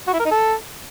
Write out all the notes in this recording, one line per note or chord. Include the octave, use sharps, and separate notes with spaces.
F#4
E4
A#4
D#4
A4